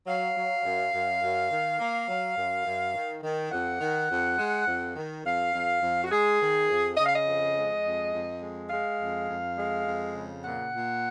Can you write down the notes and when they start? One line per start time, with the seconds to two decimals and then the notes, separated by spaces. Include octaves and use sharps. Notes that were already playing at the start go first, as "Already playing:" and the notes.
0.06 F#3 F5
0.36 F#3
0.64 F#2
0.93 F#2
1.21 F#2
1.50 D#3
1.79 A#3
2.08 F#3
2.37 F#2
2.65 F#2
2.94 D#3
3.23 D#3
3.52 F2 F#5
3.81 D#3
4.10 F2
4.38 G#3
4.67 F2
4.96 D#3
5.24 F2 F5
5.53 F2
5.82 F2
6.03 F#4
6.11 G#3 G#4
6.40 D#3
6.69 F2
6.97 C#3 D#5
7.06 F5
7.14 D#5
7.26 F2
7.55 G#3
7.84 F2
8.12 F2
8.41 G#3
8.70 G#3 F5
8.99 F2
9.28 F2
9.57 G#3
9.85 F2
10.14 C#3
10.43 A#2 F#5
10.71 A#2